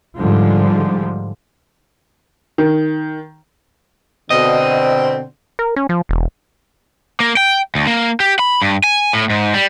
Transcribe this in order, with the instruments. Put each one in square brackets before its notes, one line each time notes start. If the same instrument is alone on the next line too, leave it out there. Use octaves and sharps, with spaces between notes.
[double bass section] G#2 D3 F3 G3 G#3
[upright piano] D#3
[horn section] B2 D3 C4 [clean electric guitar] D#5
[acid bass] A#4
C#4
F3
E1
[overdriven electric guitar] A#3
G5
D2
A#3
G4
B5
G2
G#5
A2
G#2
G3